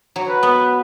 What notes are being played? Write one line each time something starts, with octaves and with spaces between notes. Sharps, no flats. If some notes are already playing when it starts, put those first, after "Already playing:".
F#3
B4
B3